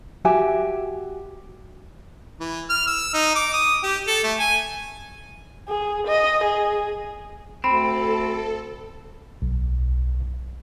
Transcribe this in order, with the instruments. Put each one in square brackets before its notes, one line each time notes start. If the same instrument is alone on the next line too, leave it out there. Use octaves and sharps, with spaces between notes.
[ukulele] F#4 G4 E5 G#5
[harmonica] E3
F6
E6
D#4
D6
D#6
G4
A4
A3
G#5
[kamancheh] G#4
D#5
G#4
[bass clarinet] D2 [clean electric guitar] C4 [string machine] A4 [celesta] B5
[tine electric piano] B1